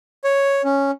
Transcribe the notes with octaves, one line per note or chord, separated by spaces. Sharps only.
C#5
C#4